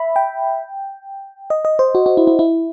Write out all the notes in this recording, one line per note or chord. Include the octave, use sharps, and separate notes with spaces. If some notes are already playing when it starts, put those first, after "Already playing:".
Already playing: E5 B5
G5
D#5
D#5
C5
F#4
F#4
E4
E4
E4